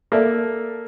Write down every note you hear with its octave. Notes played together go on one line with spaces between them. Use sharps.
A#3 A4 D5 E5